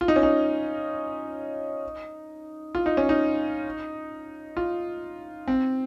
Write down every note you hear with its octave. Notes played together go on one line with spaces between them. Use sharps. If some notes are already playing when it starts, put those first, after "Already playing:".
F4
D#4
C#4
D#4
F4
D#4
C#4
D#4
F4
C4